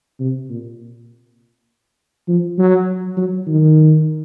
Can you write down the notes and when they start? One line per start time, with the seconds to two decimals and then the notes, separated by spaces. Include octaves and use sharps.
0.20 C3
0.49 A#2
2.28 F3
2.58 F#3
3.17 F#3
3.47 D#3